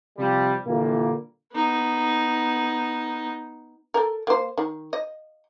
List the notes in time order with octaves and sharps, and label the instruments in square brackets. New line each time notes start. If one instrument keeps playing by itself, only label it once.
[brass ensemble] C3 F3 G3
A#2 D3 E3 F3 G3 A#3
[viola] B3 D#4
[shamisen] A4 A#4
A#3 C5
D#3
D#5